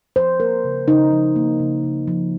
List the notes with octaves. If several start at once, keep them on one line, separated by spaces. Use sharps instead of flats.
F3 C5
A#3 A#4
C#3
C#3 D#4
F3
A#3
C#3
C#3
F3